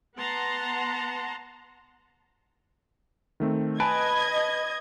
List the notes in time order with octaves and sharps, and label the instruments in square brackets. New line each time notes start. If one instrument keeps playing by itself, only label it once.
[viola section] B3 F#5 A5 A#5 C6
[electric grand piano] D#3 A3 C4
[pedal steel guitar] B4 [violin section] D#5 G#6 [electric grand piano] G#5 A5 D7